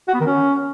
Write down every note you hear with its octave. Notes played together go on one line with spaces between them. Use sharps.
F#4
B3
D#3
C#4